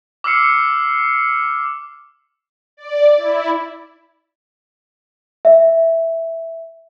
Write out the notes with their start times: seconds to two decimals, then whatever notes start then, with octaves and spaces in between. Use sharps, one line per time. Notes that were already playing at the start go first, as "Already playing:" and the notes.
0.24 D6 E6 F6 C7 C#7
2.77 D5
3.17 E4
5.45 E5